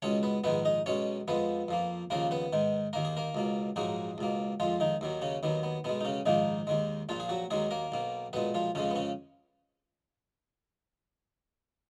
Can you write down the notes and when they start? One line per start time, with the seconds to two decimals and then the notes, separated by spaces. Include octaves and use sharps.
0.02 C#2 B2 G#3 C#4 C#5
0.23 B3 B4
0.44 A#1 G#2 D#3 G#3 B3 B4
0.65 D#4 D#5
0.86 B1 B2 G#3 C#4 C#5
1.28 F2 F3 G#3 B3 B4
1.68 F2 F3 A#3
2.10 D#2 C#3 F3 A#3 A#4
2.31 B3 B4
2.53 G#2 D#3 G#3
2.93 D#2 D#3 A#3 A#4
3.05 G#4
3.17 A#3 A#4
3.35 C#2 B2 A#3
3.76 A#1 G#2 F#3 G#3 A#3 G#4
4.18 C#2 B2 A#3
4.60 F2 F3 G#3 F4
4.80 D#3 D#4
5.01 D#2 D#3 F#3
5.22 C#3 C#4
5.43 D#2 D#3 F#3 B3
5.63 B3
5.84 B1 B2 G#3 B3
6.01 D#4
6.05 C#3 C#4
6.26 A#1 G#2 D#3 F3 A#3 D#4
6.67 D#2 D#3 G#3
7.09 A#1 A#2 F3 F4
7.20 G#4
7.29 F#3 F#4
7.51 D#2 D#3 F#3 G#3 G#4
7.71 A#3 A#4
7.92 B1 B2 A#3
8.33 B1 A#2 G#3 B3 B4
8.55 F3 F4
8.75 F2 C#3 F3 G#3 C#4
8.91 B3
8.96 C#3 C#4